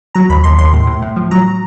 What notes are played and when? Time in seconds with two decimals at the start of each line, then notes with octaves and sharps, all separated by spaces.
0.15 F#3 A#5
0.29 D#2 B5
0.44 D#2 C6
0.58 D#2 C6
0.73 A2
0.87 A2
1.02 A2
1.16 F3
1.31 F#3 A#5